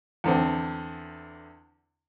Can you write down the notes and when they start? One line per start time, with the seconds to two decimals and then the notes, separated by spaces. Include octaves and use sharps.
0.24 E2 D3 C4